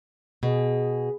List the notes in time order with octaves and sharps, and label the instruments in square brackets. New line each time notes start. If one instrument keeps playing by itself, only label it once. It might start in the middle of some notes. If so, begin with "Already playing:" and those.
[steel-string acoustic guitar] B2 [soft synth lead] G#4